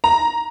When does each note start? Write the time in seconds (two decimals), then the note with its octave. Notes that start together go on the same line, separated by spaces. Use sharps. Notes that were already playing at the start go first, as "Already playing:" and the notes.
0.04 A#5